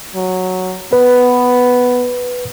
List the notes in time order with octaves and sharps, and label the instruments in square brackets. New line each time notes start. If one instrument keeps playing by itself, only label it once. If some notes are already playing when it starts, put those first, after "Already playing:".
[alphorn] F#3
[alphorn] B3 [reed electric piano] B4